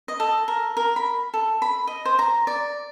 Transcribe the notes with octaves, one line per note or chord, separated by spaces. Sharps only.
D#5
A4
A#4
A#4
B5
A4
B5
D#5
C5
A#5
D5